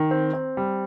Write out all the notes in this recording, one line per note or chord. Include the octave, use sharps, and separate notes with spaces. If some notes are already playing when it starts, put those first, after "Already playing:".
Already playing: D#3
C4
C4
G3